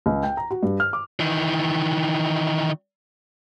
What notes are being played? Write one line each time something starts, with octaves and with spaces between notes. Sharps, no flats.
C#2
G5
A#5
F#4
G2
F6
D6
D#3 E3